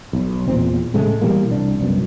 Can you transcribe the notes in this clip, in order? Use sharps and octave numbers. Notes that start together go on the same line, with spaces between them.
B1
E2 A#2 C4
A2 C#3 G#3 A3
B2 E3 G3 A#3
C2 D4
C2 F#2 B2